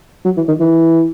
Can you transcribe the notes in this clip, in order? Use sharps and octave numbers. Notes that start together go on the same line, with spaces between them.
F#3
E3
D#3
E3